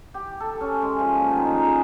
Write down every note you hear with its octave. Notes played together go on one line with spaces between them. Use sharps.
G4
A4
C#4
G#3
F3
A#2
D#3
D#4
G#4